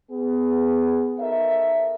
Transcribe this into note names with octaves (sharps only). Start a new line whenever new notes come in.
B3 G#4
D#4 A4 A#4 C#5 E5